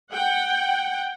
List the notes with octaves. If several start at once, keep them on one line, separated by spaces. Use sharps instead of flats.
F#5 G5